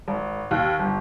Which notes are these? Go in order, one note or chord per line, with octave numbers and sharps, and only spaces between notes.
G#1
D#2
G1